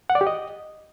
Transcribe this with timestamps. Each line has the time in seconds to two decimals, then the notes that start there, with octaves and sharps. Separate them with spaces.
0.10 F#5
0.15 D5
0.21 G4
0.27 D#5